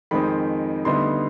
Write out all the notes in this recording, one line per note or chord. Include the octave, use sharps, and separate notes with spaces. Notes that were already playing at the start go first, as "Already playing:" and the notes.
F2 D#3 G#3 C4 D#4 B5
D2 D3 G3 B3 D#4 C6